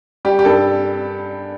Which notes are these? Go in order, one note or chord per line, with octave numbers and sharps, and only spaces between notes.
G3 G4
G4
G2 A4